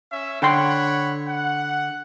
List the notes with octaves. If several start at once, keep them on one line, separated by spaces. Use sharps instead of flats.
C#4 E5
D3 C#5 F#5 G5 B5 C6
F#5